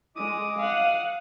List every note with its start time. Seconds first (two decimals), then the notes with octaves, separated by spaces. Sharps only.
0.16 G#3 D#5 D6 D#6
0.59 F5 F#5